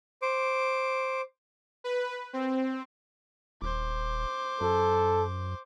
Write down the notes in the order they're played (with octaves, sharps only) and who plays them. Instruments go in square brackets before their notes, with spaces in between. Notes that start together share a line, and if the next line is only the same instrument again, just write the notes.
[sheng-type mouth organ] C5 D6
[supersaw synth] B4
C4
[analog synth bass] D#1 [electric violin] C5 D6
[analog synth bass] F#2 [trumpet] A4